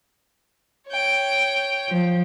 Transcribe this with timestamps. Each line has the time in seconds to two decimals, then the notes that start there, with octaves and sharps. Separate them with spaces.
0.88 C#5 G5
1.89 F3